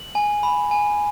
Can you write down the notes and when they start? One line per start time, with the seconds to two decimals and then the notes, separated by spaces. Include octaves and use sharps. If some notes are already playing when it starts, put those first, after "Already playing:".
Already playing: F#7
0.15 G#5
0.43 B5
0.71 G#5